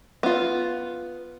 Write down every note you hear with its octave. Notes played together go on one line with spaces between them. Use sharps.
B3 F4